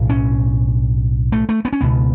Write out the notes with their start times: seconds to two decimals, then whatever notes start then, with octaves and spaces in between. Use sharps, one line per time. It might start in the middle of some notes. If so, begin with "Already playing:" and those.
Already playing: B1 A2
0.10 C#4
1.32 A3
1.49 A3
1.65 B3
1.73 C#4
1.81 C#2 B2 B3